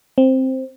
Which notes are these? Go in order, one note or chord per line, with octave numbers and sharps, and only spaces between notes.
C4